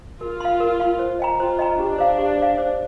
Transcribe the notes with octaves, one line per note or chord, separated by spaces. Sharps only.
F4 A#4
F5 C6
A#4
F5 C6
C5
D#5 G5 A#5
F4 C5
D#5 G5 A#5
D4 G4
C5 F5
G4
C5 F5
C5